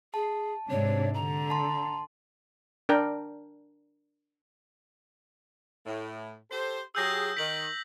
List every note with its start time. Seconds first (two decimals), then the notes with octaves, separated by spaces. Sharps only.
0.14 G#4 A5
0.70 G#2 C3 D4 C#5
1.14 D3 A#5
1.50 A5 C6
2.89 D4 A#4 G5
5.85 A2
6.51 G4 A4 C5
6.95 F#3 G4 G#4 E6 G6 A#6
7.37 D#3 B6 F#7